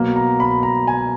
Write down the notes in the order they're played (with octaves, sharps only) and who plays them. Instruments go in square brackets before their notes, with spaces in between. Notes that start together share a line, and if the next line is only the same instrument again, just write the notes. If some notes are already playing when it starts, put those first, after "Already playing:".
Already playing: [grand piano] B2 F#3 A#3
A#5
B5
A#5
G#5